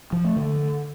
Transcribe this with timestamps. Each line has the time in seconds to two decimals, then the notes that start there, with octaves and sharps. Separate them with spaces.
0.12 F3
0.24 A3
0.36 D3